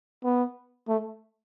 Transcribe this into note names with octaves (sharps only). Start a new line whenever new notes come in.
B3
A3